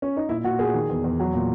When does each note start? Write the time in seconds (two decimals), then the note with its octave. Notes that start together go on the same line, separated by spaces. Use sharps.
0.02 C#4
0.17 D#4
0.29 A#2 E4
0.44 A#2 F#4
0.59 A#2 G#4
0.74 D#3
0.89 E2
1.04 E2
1.20 F#3
1.33 A#2